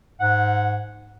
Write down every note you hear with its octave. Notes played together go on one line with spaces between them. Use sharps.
G#2 F#5